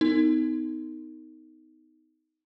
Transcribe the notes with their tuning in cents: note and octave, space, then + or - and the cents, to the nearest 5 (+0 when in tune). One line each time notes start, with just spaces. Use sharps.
B3 +40 D#4 +15 A#4 -45